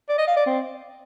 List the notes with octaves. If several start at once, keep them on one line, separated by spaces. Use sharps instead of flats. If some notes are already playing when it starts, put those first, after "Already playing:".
D5
D#5
F5
D5
C4